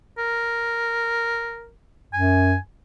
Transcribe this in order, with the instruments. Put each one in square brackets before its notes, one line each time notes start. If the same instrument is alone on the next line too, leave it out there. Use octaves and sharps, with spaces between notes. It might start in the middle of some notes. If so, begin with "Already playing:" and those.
[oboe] A#4
[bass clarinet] F#2 [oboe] G#5